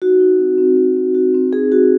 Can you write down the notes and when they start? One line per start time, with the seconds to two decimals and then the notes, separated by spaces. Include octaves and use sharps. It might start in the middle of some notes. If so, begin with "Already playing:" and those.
0.02 D#4 F#4
0.20 D#4
0.39 C4
0.58 C4
0.77 C4
0.97 C4
1.15 F#4
1.34 C4
1.53 D#4 G#4
1.72 F#4